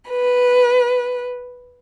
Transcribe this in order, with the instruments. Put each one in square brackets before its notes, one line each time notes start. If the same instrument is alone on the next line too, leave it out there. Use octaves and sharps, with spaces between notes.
[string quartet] B4